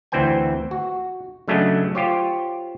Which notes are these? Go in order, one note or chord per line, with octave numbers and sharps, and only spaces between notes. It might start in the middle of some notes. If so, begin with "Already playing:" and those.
D2 E3 C4 C5 G5 G#5
F#4
C#3 F#3 A3 C#4 D4 D#5
F4 G4 C5 C#5